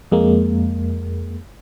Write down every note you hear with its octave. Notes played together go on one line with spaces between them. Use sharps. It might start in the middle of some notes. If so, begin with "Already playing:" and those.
F2 G#3 A#3